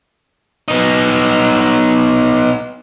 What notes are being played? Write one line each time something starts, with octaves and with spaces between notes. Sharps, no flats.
B3 D#4